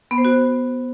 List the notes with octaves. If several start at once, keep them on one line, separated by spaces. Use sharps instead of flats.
B3
C5
F#4